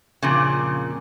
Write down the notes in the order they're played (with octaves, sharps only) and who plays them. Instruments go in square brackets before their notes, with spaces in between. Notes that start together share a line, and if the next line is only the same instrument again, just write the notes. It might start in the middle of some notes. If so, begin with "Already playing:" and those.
[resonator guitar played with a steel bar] F2 A#2 C#3